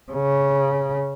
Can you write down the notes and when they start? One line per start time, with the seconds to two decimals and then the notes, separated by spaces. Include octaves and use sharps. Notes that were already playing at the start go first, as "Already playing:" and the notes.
0.12 C#3